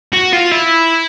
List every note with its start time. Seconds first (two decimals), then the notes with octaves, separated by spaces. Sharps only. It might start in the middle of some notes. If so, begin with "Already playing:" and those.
0.13 F#4
0.33 F4
0.51 E4